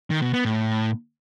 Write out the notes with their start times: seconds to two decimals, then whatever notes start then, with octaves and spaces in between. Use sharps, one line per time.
0.10 D#3
0.22 B2
0.33 B3
0.45 A2